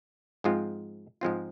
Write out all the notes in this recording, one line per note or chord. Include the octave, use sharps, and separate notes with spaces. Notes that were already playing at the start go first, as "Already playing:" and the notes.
G#2 F3 G#3 C4 F4
G#2 F3 G#3 C4 F4